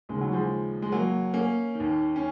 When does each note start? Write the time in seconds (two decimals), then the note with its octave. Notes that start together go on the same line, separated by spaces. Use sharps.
0.09 D#2 C#3 G#3
0.21 F#3
0.32 F3 G#3
0.82 G#3
0.92 F#3 A#3
1.33 A#3 C#4
1.75 D#2 D#3
2.16 C#4